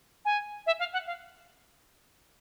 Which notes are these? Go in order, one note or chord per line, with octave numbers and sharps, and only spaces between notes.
G#5
E5
F5
F#5
F5